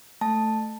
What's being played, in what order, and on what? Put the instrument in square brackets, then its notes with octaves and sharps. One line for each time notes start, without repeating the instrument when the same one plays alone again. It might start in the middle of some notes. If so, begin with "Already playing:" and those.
[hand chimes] A3 A5